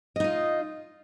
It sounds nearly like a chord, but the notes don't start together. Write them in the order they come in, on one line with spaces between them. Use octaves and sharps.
D#5 D#4 F4